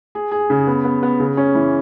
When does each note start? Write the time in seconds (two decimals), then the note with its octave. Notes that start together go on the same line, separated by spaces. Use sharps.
0.15 G#4
0.31 G#4
0.50 C#3
0.67 B3
0.85 B3
1.03 B3
1.20 C#3
1.37 C#4
1.55 E3